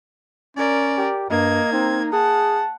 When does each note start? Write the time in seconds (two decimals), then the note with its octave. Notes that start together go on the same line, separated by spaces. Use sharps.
0.57 C#4 A#4 D5
0.97 G4
1.30 G2 A#3 D#5 G#6
1.72 C4 D#4
2.13 G#4 F#5 A5